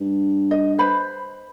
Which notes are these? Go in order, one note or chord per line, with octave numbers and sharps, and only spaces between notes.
G2
D#5
B4 C5 B5